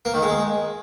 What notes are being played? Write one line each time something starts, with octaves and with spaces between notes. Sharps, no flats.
A#3
D#3
G#3